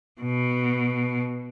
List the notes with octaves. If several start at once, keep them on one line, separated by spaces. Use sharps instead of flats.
B2